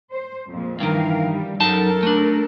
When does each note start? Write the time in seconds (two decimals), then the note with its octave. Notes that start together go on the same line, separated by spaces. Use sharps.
0.12 C5
0.48 F2 A#2 G#3
0.80 G2 D#3 E3 A#4 F5
1.27 G3
1.60 F#2 F#3 D#4 A4 A#4 A5
2.03 A3 D4